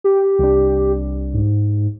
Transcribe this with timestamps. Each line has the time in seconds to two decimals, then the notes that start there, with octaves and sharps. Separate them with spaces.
0.04 G4
0.39 C2 D4
1.33 G#2